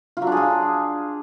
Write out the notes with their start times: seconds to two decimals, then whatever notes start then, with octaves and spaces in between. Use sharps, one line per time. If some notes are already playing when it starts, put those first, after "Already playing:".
0.17 F4
0.22 F#3
0.27 D4
0.32 G#4
0.37 F4